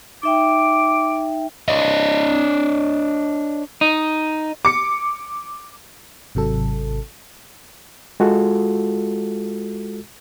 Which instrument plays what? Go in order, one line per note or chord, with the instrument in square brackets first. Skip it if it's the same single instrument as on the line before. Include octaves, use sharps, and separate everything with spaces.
[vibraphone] D#4 E5 G5 [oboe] D6
[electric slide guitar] D4 C#5 D#5
[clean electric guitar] D#4
[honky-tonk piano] D6 C#7
[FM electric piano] G#1 C3 F#3 A4
[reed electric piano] G#3 F4 F#4 A4